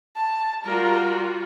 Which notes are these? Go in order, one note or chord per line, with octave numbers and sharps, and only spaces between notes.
A5
G3 F4 F#4 A#4